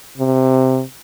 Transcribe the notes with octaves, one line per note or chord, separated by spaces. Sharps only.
C3